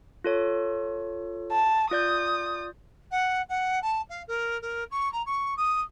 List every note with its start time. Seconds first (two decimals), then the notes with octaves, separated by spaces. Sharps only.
0.24 F4 A4 C#5
1.52 A5
1.91 F4 D5 D#6 G6
3.11 F#5
3.49 F#5
3.82 A5
4.09 F5
4.27 A#4
4.61 A#4
4.91 C#6
5.12 A#5
5.25 C#6
5.57 D#6